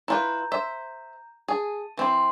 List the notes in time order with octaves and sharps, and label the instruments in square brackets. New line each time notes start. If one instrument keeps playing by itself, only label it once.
[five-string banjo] E4 F4 B4 [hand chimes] A#5 G6
[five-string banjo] C5 E5
[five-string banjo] G#4 [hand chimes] A5
[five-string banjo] E3 C4 [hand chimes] E5 C6